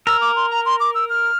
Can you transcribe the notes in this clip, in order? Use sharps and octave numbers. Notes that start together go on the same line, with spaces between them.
A#4 E6
D6
C6
A#5
C6
D6
E6
F6